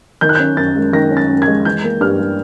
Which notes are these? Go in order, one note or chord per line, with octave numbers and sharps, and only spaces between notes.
D#3 G6
F#6
C#4 G6
F#2 A6
G#3
D#3 A#6
C#4
A6
F#2
G#6
G#3
E3 G6
A#3
G2 F6
G3